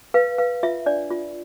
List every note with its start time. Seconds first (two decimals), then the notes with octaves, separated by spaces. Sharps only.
0.14 B4 F5
0.38 B4 F5
0.63 F4 E5
0.86 D4 D5
1.11 F4